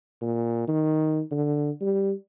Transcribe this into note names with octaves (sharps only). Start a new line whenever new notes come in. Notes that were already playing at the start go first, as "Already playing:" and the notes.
A#2
D#3
D3
G3